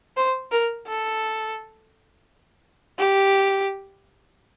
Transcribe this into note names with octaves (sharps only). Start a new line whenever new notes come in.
C5
A#4
A4
G4